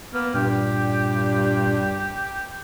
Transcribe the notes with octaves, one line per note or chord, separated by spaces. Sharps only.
A#3 B3
G2 A#2 G4